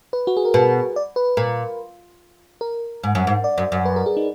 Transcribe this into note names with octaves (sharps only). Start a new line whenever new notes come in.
B4
F#4
G#4
A#4
B2 B4
D5
B4
A#2 A#4
A#4
G#2
F#2
G#2
D5
F#2
F#2
B4
A#4
G#4
D#4